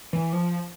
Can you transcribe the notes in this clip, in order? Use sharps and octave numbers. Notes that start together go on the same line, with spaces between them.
E3
F3